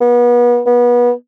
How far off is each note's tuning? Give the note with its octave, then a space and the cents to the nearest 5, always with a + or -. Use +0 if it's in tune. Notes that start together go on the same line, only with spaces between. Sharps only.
B3 -35
B3 -30